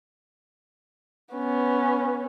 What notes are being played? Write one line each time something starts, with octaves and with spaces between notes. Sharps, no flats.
B3 C#4